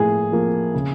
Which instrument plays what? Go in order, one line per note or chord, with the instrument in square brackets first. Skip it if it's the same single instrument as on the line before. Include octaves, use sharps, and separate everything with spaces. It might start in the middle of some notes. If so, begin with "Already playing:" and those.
Already playing: [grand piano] A2 F3 A#3 [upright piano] G#4
[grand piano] F3 A#3
C#3